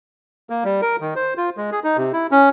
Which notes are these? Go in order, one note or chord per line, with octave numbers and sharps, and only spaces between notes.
A#3
G3
A#4
D#3
C5
F4
G#3
G#4
D#4
C3
E4
C#4